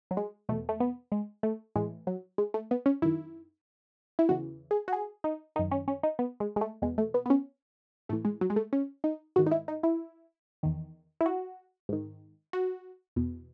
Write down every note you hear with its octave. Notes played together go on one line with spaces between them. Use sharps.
F#3
G#3
E2 B2 A3
A3
B3
G#3
A3
A2 E3 G#3
F#3
G#3
A3
B3
C#4
F#2 D#3 E4
E4
E2 C#3 E3 F#4
G#4
F#4
G#4
D#4
F#2 D#3 D#4
C#4
C#4
D#4
B3
G#3
G#3
A3
E2 B2 G#3
A3
B3
B3
C#4
A2 E3 A3
G#3
F#3
G#3
A3
C#4
D#4
G#2 D#3 F#4
D#4
E4
D#4
E4
E2 D#3
E4
F#4
G#2 D#3
F#4
E2 B2